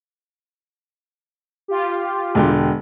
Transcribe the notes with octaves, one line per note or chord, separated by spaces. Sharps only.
F4 G4
E1 D3 G5